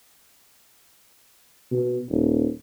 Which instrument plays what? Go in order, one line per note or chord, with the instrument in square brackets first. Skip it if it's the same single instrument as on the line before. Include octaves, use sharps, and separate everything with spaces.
[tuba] B2
D#1